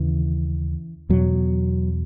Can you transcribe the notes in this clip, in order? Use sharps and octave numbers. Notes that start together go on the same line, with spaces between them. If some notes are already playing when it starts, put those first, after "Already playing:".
Already playing: D#2 C#3 E3
E2 B2 F#3